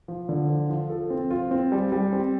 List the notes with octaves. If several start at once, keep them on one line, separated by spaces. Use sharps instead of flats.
F3
D3
F3
F3
A4
C4
F4
C4
G3
G3
C4